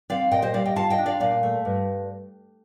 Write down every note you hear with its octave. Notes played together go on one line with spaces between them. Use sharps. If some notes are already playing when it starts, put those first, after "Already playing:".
C4 D5 F5
A#2 D#5 G5
C5 D#5
G3 D5 F5
D#5 G5
F4 F5 A5
D#5 G5
D4
D5 F5
A#2 D5 F5
A3
G2